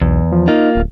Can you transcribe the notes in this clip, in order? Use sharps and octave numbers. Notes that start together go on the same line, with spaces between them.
B1 E2
F3
A#3 D#4 F4
D1